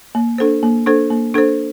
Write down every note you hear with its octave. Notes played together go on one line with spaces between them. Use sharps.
A#3
D4 A4 C5
A#3
D4 A4 C5
A#3
D4 A4 C5